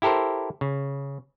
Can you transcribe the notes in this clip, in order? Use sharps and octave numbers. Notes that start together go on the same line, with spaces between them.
E4 G4 A4 A#4 C5
C#3